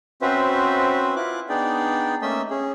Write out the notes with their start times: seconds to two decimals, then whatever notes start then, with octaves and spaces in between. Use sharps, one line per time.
0.22 C4 C#4 F#4 B4 C5 E5
1.16 E4 F4 D6 F#6
1.49 B3 D4 D#4 G#4 D5 G5
2.22 A3 A#3 C#4 D#5 E5 E6
2.50 C#4 G#4